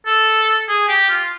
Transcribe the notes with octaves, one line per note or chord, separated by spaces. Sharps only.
A4
G#4
G4
F4